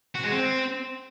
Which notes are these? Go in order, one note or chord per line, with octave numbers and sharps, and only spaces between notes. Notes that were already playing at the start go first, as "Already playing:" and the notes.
F#4
G#3
C4